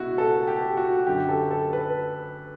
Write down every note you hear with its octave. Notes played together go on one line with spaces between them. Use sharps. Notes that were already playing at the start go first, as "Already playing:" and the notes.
Already playing: C#2 B2 E4 F#4
A4
G4
F#4
F#2 D3 G4
A4
A4
B4